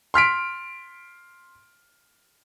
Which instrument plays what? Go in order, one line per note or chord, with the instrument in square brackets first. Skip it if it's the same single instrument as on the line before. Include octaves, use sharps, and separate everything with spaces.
[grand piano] C6 F6 B6 D7